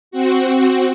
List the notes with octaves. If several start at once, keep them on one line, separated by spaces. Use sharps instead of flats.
C4 F#4